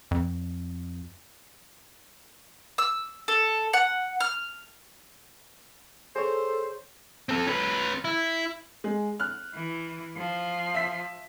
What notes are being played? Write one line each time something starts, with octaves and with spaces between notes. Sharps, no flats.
F2
E6
A4
F#5
F6
G#4 A4 C5 C#5
C4 A4
C#4 B4
E4
G#3
F6 F#6
E3
F3
E5 B6